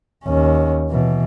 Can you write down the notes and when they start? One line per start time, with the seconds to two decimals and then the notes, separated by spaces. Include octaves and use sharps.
0.24 D#2 C#4
0.90 B2 E3